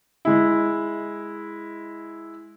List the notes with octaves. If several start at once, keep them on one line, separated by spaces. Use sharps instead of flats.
G#3 E4